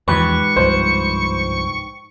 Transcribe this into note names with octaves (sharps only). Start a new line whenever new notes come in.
E2 G#2 E3 F3 G4 B4 C#6
C2 G2 F3 C5